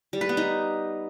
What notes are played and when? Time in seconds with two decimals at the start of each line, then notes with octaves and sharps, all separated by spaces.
0.13 G3
0.21 B4
0.29 B3
0.37 D#4